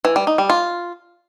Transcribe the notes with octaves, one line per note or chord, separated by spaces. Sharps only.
E3
G3
D#4
G3
F4